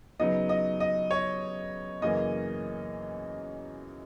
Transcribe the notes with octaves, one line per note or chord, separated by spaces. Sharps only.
C#3 F#3 B3 D#4 D#5
D#5
D#5
C#5
F#2 C#3 E3 A#3 C#4 D#5